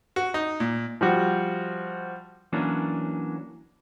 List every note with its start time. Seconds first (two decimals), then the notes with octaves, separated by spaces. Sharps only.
0.16 F#4
0.34 D#4
0.60 A#2
1.01 F3 G3 F#4
2.53 E3 F#3 A#3 C#4 D4